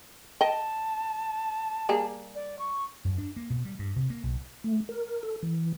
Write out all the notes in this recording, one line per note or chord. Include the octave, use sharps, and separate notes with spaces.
D#5 G5 A5
G3 A#3 G#4
D5
C#6
F#2
D4
A#3
B2
G3
G2
C3
A#3
B1
A3
A#4
A4
E3